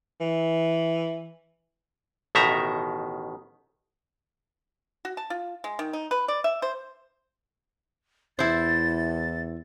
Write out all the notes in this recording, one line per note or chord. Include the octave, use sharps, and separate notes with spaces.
E3
A1 B2 D#3 E5 A#5
F#4
A5
F4
G#3
D#3
D#4
B4
D5
E5
C5
E2 E4 C5 A6